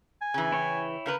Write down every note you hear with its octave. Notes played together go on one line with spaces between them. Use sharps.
G#5
C#3 E3
E4 C#5 G5
C#3 A#4 B4